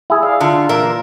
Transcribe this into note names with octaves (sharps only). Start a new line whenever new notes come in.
E4 G#4
D5 F5
D3 F4
A#2 E3 A#3 A#4 E5